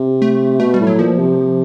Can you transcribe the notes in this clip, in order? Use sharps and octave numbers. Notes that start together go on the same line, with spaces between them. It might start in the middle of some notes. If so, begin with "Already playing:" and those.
Already playing: C3
A3
B2 A3
G3
A2
F#3
A#2 F3
C3